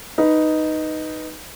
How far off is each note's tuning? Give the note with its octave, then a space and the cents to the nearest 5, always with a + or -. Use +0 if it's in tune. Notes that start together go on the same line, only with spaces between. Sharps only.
D#4 +0 B4 +0